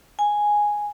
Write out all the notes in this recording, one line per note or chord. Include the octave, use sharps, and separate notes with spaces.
G#5